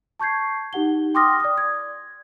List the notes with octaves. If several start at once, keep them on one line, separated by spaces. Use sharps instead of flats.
A5 C#6 G6 G#6 C7
D#4 G4 F#5 G7
G5 C6 D6 D#6 F6 A#6
D5 D#6
G#6